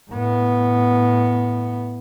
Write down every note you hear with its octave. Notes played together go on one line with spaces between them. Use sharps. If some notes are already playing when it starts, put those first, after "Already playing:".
A2 B3